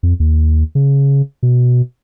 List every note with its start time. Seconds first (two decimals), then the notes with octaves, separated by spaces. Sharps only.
0.03 F2
0.20 D#2
0.75 C#3
1.43 B2